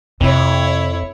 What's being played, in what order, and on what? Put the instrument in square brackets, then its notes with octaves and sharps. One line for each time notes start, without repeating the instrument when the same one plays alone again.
[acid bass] F2 [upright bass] C3 [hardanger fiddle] E4 C#5